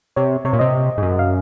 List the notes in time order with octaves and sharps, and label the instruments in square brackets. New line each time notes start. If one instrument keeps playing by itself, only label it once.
[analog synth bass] C3 [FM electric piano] C#5
[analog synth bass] C3 [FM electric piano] C#5
[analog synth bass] A#2
[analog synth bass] C3 [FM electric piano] D#5
[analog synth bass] G#2
F#2
[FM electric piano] F5